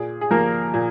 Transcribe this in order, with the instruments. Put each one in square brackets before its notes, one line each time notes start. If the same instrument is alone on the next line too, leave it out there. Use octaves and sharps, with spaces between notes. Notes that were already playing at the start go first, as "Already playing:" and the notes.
Already playing: [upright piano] A#2 G#4
G#4
F3 A#3 A#4
A#2